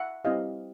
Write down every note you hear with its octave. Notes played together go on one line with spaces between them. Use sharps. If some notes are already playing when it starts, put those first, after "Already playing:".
Already playing: E5 F#5
G3 C4 E4 G4 D#5 F5